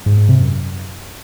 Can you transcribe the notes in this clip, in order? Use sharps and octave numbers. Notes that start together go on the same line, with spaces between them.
G#2
G#2
C3
F#2